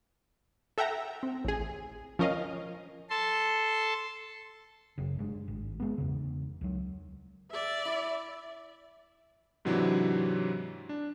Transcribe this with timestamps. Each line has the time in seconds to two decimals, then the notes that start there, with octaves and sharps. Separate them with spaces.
0.78 A4 E5 F#5 G5 A#5
1.23 C4
1.44 A1 G#4
2.19 F3 C#4 A#4 D#5 F5
3.10 A4 A5 C6
4.98 F#1 C#3
5.19 G2 G#3
5.48 G#1
5.80 G#3 B3
5.98 E2 C#3
6.61 C#2 F#3
7.51 D5 E5
7.85 E4
9.65 G#2 C3 E3 F#3 D4 E4
10.89 D4